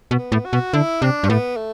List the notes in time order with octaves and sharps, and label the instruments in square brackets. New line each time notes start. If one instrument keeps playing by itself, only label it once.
[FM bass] B2
[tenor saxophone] B3
[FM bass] A2
[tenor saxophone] F#4
[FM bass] B2
[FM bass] D3 [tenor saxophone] E4
[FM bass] C3 [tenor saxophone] D4
[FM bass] G2
[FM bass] A2 [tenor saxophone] B3
[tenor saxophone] A3